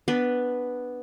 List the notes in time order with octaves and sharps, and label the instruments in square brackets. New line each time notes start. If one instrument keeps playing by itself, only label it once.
[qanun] B3 D4 B4